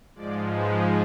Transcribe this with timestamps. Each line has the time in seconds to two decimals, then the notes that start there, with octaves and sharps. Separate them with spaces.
0.15 G#2 F3 G#3 D5
0.55 B4